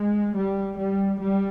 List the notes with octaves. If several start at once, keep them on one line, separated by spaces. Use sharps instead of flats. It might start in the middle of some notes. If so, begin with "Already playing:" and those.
Already playing: G#3
G3
G3
G3